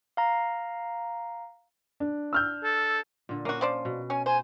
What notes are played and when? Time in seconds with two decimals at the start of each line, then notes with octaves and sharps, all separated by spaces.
0.17 F5 A#5
2.00 D4
2.33 E6 F6 G6
2.63 A4
3.29 A#2 D3
3.45 A#3 C#4 F#4
3.61 F3 C5 D5
3.85 B2
4.10 C#4 G#5
4.26 C5 G#5